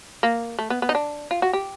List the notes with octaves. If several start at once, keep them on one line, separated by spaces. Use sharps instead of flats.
A#3
A3
B3
B3
D#4
D4
F4
F#4
G4